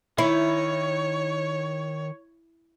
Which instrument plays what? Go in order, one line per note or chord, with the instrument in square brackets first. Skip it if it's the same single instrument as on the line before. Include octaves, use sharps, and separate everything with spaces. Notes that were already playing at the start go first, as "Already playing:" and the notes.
[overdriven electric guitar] D#3 [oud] E4 [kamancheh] C#5